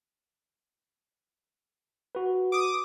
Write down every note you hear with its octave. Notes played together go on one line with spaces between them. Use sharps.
F#4 B4
D6 D#6